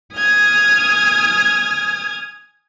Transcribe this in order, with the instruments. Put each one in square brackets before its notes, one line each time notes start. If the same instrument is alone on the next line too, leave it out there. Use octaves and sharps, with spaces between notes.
[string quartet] G#5 D#6 F6 G#6